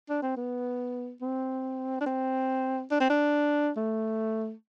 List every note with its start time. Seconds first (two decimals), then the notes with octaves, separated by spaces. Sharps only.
0.09 D4
0.22 C4
0.37 B3
1.21 C4
2.01 D4
2.07 C4
2.91 D4
3.00 C4
3.10 D4
3.77 A3